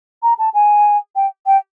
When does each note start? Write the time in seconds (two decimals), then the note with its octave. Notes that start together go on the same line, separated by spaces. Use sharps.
0.23 A#5
0.38 A5
0.54 G#5
1.16 G5
1.46 G5